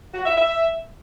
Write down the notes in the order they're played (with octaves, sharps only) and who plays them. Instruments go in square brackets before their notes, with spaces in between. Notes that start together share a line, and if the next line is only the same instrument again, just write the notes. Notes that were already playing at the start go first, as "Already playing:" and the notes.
[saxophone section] F#4
E5
E5